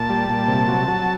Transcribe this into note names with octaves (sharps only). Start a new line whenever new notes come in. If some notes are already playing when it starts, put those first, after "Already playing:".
Already playing: A#2 A5
G3
A#2
C3
F#3
F#3